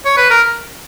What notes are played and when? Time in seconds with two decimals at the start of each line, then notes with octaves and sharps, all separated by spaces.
0.06 C#5
0.18 B4
0.31 A#4